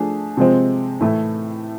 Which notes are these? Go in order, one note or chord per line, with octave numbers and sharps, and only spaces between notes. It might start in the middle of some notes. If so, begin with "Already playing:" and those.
Already playing: F3 A3 D4 G#4
C3 F3 G#3 C4
A2 E3 A3 E4